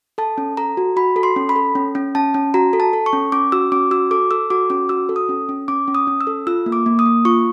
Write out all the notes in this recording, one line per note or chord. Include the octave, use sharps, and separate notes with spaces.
A4 A5
C#4
A4 A#5
F#4
F#4 B5
A4
C6
C#4
B5
A4
C#4
C#4
C#4 A5
C#4
F#4 A#5
A4
A5
A4
C#6
C#4
C#4 D6
F#4 E6
C#4 D6
F#4 E6
A4 D6
A4 E6
F#4 D6
C#4 D6
F#4 E6
A4
D#6
C#4
C#4
C#4 D6
C#4
D#6
C#4
E6
A4
F4 E6
A#3
D6
A#3
D#6
A#3
F4 C#6